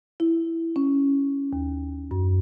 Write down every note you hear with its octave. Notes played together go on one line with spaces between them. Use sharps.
E4
C#4
D#2
F#2